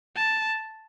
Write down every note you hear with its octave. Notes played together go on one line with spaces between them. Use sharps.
A5